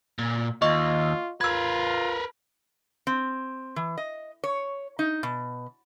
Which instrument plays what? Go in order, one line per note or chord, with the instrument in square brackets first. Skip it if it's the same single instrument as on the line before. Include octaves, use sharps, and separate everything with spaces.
[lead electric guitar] A#2
[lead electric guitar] D#2 [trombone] F4 [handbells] D#5 C#6
[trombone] F4 [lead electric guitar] A#4 B4 [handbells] E6 G#6
[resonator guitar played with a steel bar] C4
E3
D#5
C#5
D#4
B2